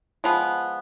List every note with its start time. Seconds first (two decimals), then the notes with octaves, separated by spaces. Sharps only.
0.24 F3 G#3 B3